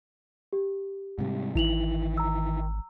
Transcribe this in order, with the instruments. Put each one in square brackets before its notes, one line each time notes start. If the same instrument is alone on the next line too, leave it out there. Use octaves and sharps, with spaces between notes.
[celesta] G4
[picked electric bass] G#2 C3 G3
[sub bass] G#1 [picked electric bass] D#3 E3 [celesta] E4 F7 F#7
[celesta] A#5 E6